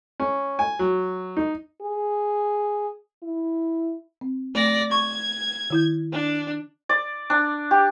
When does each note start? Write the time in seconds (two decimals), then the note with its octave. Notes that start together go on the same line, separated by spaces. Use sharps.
0.20 C#4
0.59 G#5
0.79 F#3
1.37 D#4
1.82 G#4
3.23 E4
4.21 C4
4.55 A3 D5 A#6
4.91 C#6 G#6
5.70 D#3 E4 G6
6.13 D4
6.89 D5
7.30 D4
7.71 G4